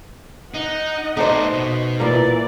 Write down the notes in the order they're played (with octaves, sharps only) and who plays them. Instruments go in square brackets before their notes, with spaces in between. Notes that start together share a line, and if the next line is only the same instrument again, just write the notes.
[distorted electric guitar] D#4 [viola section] D#5 F#5
[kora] A3 [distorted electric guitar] B3 D5 [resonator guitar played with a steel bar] D#4 C5
[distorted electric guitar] B2
[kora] A#2 A#3 A#4 [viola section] E3 D5